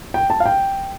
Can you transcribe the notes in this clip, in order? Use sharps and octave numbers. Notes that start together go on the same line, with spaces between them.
G5
A5
F5
G5